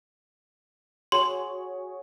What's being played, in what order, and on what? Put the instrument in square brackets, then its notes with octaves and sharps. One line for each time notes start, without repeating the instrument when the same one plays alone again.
[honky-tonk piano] F#4 G#4 C#5 [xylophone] C6